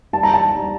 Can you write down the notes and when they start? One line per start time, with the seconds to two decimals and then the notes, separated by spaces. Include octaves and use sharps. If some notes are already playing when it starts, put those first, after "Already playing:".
0.13 G3 A5
0.23 A#5
0.34 A5
0.55 G3